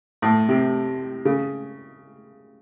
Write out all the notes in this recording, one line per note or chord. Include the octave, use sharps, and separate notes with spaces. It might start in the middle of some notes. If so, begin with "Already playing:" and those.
A2
C3
C#3